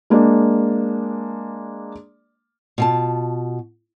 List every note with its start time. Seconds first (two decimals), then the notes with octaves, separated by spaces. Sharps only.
0.10 G#3 A#3 D4 D5
2.78 B2 F4 A5